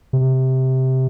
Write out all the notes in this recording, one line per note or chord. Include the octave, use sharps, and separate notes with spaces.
C3